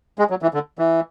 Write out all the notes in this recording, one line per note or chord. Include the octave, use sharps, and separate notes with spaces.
G#3
F#3
E3
D3
E3